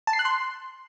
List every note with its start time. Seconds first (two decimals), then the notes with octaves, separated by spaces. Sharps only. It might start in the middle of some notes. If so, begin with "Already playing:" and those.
0.07 A5
0.13 C7
0.19 F#6
0.25 C6